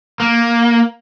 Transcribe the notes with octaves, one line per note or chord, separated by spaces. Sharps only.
A#3